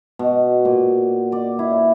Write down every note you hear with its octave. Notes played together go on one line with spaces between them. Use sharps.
B2
A#2
D5
E4